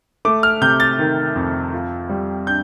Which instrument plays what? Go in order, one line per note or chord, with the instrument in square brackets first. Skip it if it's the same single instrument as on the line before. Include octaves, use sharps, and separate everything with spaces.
[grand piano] A3 D6
F6
C3 G6
A6
D#3
F2
F4
G3
D4 G6